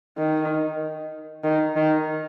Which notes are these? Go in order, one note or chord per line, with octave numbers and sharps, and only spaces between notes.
D#3
D#3
D#3